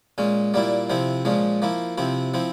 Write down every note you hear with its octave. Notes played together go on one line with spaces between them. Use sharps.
A#2 G#3 C#4
A#2 G3 A#3 E4
C3 F3 C4 E4
A#2 F3 G#3 C#4
F3 A#3 E4
C3 F3 C4 E4
F3 C4 E4